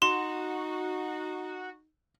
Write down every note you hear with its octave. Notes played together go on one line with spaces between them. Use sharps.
D#4 F#4 C6 E7